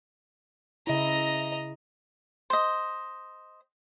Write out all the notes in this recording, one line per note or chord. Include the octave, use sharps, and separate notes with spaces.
C#3 E4 D#5 A#5
C5 D#5